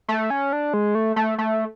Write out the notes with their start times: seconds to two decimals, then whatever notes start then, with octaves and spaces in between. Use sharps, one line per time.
0.08 A3
0.30 C#4
0.53 D4
0.74 G#3
0.95 A3
1.16 A3
1.38 A3